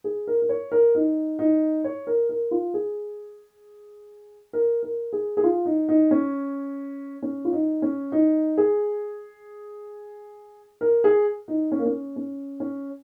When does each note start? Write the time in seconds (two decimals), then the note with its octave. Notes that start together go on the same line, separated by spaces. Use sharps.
0.04 G#4
0.27 A#4
0.42 A#4
0.49 C#5
0.72 A#4
0.95 D#4
1.39 D#4
1.84 C#5
2.07 A#4
2.29 A#4
2.51 F4
2.74 G#4
4.53 A#4
4.83 A#4
5.13 G#4
5.37 G#4
5.43 F4
5.65 D#4
5.89 D#4
6.11 C#4
7.22 C#4
7.45 F4
7.52 D#4
7.82 C#4
8.12 D#4
8.57 G#4
10.81 A#4
11.04 G#4
11.48 D#4
11.72 C#4
11.79 A#3
11.85 C#4
12.16 C#4
12.60 C#4